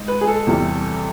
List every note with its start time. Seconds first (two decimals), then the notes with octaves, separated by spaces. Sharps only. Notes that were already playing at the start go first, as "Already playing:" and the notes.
Already playing: G#2
0.08 B4
0.21 G#4
0.27 A4
0.47 E2 C3 E3 G3